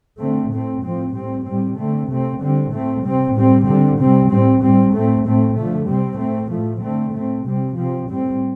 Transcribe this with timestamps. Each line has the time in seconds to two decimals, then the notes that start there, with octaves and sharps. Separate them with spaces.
0.19 D3 A3 C4
0.50 A2 A3 C4
0.83 A2 F3 C4
1.13 A2 G3 C4
1.46 A2 G3 C4
1.77 D3 A3 C4
2.08 C3 A3 C4
2.40 D3 G3 C4
2.72 A2 A3 C4
3.03 C3 G3 C4
3.34 A2 G3 C4
3.66 D3 G3 C4
3.97 C3 G3 C4
4.29 A2 G3 C4
4.61 A2 G3 C4
4.93 A2 A3 C4
5.24 A2 A3 C4
5.55 D3 F3 A3
5.87 C3 G3 C4
6.19 A2 A3 C4
6.50 A2 F3 A3
6.82 D3 A3 C4
7.14 A2 A3 C4
7.45 C3 G3 C4
7.77 C3 F3 C4
8.08 A2 G3 C4